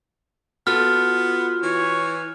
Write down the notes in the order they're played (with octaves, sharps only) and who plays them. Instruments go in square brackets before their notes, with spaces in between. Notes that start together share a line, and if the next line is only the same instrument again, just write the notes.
[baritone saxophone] B3 [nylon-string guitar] F4 F#4 A4 [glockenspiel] F6
[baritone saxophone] E3 [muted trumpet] C#5